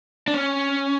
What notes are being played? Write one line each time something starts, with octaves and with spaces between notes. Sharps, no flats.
D4
C#4